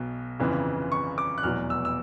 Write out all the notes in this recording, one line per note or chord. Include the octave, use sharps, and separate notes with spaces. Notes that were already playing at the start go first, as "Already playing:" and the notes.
Already playing: B1 B2
G1 F2 C#3 E3
C#6
D6
F#6
F1 E2 B2 F#3 F6
E6
E6